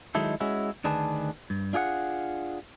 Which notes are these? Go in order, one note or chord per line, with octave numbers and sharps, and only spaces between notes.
D#3 F#3 G#3 D#4 E4 A4
G#3 C#4 E4 F#4
D2 D#3 D4 G#4 B4 A5
G2
D4 F4 G#4 D5 F#5